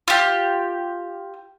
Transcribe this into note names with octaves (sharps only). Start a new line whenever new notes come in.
F4 G4